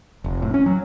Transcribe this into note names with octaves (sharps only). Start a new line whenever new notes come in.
F1
A2
C#4
F#3